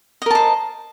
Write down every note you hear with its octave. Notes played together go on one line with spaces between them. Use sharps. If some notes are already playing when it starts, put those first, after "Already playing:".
A#4 C5 D#5 A5